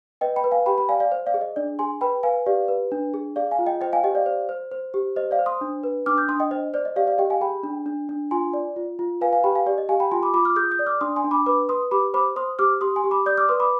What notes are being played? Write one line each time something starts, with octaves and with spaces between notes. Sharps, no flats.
B4 D#5 G5
G5 B5
B4
F5 G#5
G4 G5 B5
G5 B5
D5 F5 G#5
D5 F5
C5
D5 F5
G#4
D#5
D4 D5
G#4 G#5 C6
B4 G5 B5
B4 F5 G#5
G4 D5 F5
B4
D4
G#4
G#4 D5 F5
F5 G#5
F4
D#5 G5
C5 D#5 G5
F5 G#5
G4 D#5 G5
D5 F5
C5
C5
C5
G4
C5 D#5
D5 F5
C5
C6 D#6
D4
B4
D4 D6 F6
D#6 G6
D4 C6 D#6
D#5 G5
C5 D#5
C5 D5
D#5
G4 D5 F5
D5 F5
G4 D#5 G5
F5 G#5
G#4 G5 B5
D4
D4
D4
F4 G#5 C6
D5
F4
F4
B4 F5 G#5
F5 G#5
G4 G5 B5
F5 G#5
G4 D5
D#5
G4 F5 G#5
G5 B5
F4 G#5 C6
B5 D6
F4 B5 D6
D6 F6
G#4 D#6 G6
D#6 G6
D5
D6 F6
D4 C6 D#6
G#5 C6
D4
B5 D6
B4 B5 D6
B4 C6 D#6
G4 B5 D6
C5 B5 D6
C5 C6 D#6
G4 D6 F6
G4 C6 D#6
G#5 C6
G4
B5 D6
D5 D#6 G6
D6 F6
B4 C6 D#6
B5 D6